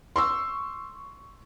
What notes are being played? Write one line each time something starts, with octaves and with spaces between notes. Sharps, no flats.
C6 C#6 E6